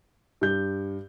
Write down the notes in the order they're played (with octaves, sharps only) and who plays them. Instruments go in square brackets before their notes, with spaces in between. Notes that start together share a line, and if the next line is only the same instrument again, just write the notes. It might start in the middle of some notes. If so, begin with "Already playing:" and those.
[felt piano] G2 G6